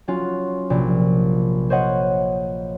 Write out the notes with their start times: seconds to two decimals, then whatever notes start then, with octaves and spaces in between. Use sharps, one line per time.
0.08 F#3 C#4 F4 F#4
0.70 A#1 C3
1.70 C5 C#5 D#5 F#5